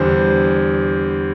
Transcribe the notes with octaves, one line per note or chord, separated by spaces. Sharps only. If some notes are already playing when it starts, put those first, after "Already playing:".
Already playing: E2 D3 G3 C5